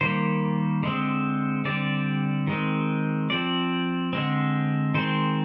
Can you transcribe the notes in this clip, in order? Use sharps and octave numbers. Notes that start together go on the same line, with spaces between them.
D#3 G3 A#3 C5
D3 G#3 C4
D3 G3 C4 D5
D#3 G#3 C4
F3 C4 D5
D3 G#3 C4
D#3 G#3 C4 C5